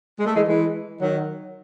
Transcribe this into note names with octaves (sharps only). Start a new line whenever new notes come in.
G#3
A3
E3 G#3
E3 G#3
D#3 F#3